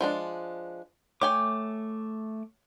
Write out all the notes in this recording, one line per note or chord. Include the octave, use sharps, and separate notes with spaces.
F3 G#3 D4
A3 C#5 G5 G#5 D6